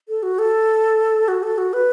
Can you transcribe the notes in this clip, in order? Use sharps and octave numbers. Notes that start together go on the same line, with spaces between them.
A4
F#4
A4
F#4
A4
F#4
B4